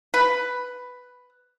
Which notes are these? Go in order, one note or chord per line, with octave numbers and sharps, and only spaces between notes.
B4